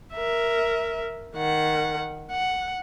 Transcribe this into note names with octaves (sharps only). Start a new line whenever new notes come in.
A#4 E5
D#3 F#5
F#5